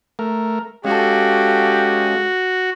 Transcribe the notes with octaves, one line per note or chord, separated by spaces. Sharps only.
A3 A#4
G#3 C#4 F#4 G4 A4 F5